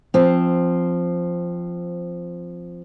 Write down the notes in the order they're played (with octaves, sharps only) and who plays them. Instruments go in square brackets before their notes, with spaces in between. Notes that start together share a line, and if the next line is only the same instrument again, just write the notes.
[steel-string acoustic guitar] F3 C4